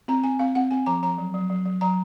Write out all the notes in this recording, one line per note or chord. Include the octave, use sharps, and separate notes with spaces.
C4 A#5
C4 G#5
C4 F5
C4 F#5
C4 G#5
F3 A#5
F3 A#5
F#3
F#3
F#3
F#3
F#3 A#5